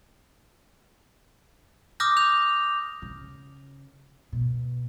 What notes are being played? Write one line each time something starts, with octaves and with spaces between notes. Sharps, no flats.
D6 D#6 F6 G6 A#6
G6 F7
C#3
B2